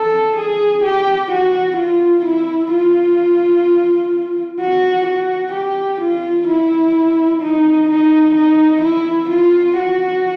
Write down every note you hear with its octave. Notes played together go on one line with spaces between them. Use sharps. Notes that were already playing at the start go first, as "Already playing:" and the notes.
Already playing: A4
G#4
G4
F#4
F4
E4
F4
F#4
F#4
G4
F4
E4
D#4
D#4
D#4
E4
F4
F#4